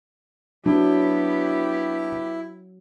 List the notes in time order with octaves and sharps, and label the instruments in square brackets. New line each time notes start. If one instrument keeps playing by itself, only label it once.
[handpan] F#3 [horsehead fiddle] B3 G4 [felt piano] D4 [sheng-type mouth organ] E4